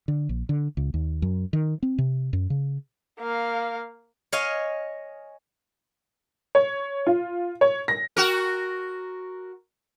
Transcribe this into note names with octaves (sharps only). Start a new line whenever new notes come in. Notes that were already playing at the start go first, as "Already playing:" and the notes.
D3
A#1
D3
C#2
D#2
F#2
D#3
C4
C3
F#2
C#3
A#3 F5
C#5 D#5 F5 G#5
C#5
F4
C#5
A#6
F#4 A#4